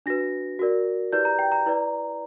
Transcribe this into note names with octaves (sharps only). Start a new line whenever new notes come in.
D4 F#4 B4 A#6
F#4 A#4 D5
E4 G4 B4 D5 G6
A#5
G5
A#5
E4 B4 D5